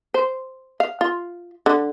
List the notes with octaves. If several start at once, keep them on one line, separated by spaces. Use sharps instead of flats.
C5
F5
F4
D3